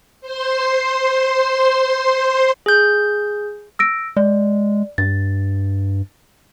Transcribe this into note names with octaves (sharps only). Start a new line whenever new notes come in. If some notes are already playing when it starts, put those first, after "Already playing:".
C5 C6
G#4 G6
E6 A#6 D7
G#3 D5
G2 A6